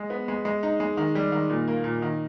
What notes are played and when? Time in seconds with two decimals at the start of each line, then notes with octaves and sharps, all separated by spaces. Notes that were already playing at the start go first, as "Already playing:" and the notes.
Already playing: G#3
0.10 B3
0.28 G#3
0.45 G#3
0.63 D#4
0.80 G#3
0.97 D#3
1.15 G3
1.32 D#3
1.50 A#2
1.68 A#3
1.84 A#2
2.02 D#3